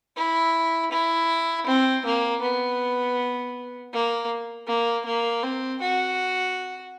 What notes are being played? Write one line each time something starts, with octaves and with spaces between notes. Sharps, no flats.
E4
E4
C4
A#3
B3
A#3
A#3
A#3
C4
F#4